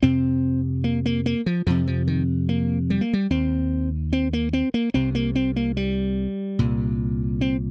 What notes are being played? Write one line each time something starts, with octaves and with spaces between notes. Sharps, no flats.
F2 C3 C4
A#3
A#3
A#3
F3
F2 C3 F3
F3
D#3
A#3
G3
A#3
G3
D#2 C4
C4
A#3
C4
A#3
C2 C3 C4
A#3
C4
A#3
G3
C2 A#2
C4